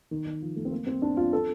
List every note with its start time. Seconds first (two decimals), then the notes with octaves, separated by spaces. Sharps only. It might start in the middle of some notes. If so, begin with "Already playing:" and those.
0.11 D#3
0.27 D#3
0.42 F3
0.56 A3
0.65 C4
0.71 A#3
0.87 C4
1.02 D4
1.17 F4
1.33 A4